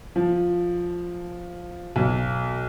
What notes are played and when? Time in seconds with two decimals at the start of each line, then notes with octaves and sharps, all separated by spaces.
0.16 F3
1.96 B1